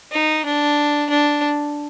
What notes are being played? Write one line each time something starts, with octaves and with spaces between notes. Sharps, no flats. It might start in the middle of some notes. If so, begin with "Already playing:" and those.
D#4
D4
D4